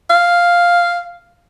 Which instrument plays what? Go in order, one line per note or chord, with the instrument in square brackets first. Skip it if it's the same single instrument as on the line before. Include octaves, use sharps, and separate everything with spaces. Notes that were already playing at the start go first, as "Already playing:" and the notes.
[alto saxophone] F5